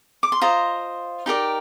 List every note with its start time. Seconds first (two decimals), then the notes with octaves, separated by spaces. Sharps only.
0.23 D6
0.32 C6
0.41 F4 C5 D#5 A#5
1.26 D#4 G4 A#4 D5